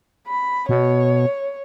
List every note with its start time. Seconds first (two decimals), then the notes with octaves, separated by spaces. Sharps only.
0.27 B5
0.69 B2 C#5